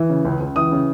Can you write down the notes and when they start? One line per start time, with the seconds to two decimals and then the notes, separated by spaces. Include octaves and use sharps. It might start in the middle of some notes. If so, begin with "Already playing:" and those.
Already playing: E3
0.10 C#3
0.25 C#2
0.40 C#2
0.56 E3 D#6
0.72 C#3